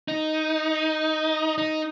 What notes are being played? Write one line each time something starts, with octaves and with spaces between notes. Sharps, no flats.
D#4
D#4